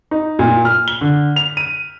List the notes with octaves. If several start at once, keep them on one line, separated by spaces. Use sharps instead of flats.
D#4
A#2
F6
G7
D3
F7
D#7